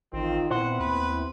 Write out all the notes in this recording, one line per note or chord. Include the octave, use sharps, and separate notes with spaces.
A1 D#3 C4 F4
A#2 B3 C4 E4 C5 F#5
D#2 B4